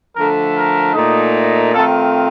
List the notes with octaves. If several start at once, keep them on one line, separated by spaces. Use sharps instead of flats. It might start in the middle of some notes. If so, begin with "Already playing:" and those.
D3 F3 A3 A#4
A#4
A#2 A3 D#4
D#3 A3 C4 F4 A4